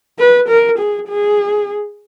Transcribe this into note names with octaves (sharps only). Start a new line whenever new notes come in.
B4
A#4
G#4
G#4